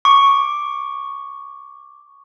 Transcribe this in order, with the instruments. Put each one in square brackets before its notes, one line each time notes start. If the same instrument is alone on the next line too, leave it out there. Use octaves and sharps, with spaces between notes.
[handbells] C#6 D6